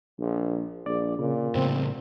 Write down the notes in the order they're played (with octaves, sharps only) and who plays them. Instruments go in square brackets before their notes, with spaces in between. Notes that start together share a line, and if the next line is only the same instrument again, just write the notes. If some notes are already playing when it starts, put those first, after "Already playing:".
[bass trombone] A#1
[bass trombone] A#1 [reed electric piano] D5
[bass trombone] A#2 [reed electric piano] C#3
[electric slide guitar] A2 C#3 [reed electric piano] C4